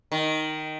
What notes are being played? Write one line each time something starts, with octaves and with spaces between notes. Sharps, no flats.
D#3